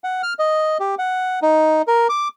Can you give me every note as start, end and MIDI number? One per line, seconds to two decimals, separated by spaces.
0.04 0.22 78
0.23 0.33 89
0.39 0.78 75
0.80 0.95 67
0.99 1.39 78
1.42 1.82 63
1.88 2.07 70
2.09 2.28 86